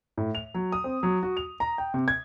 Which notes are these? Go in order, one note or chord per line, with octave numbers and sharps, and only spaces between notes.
A2
F7
F#3
D#6
C4
F#3
F#4
F7
A#5
G5
C3
G#6